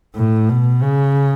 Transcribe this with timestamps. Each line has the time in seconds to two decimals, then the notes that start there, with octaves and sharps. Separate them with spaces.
0.16 A2
0.49 B2
0.83 C#3